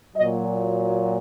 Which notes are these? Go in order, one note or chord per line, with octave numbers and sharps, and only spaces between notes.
A#2 F#3 D#5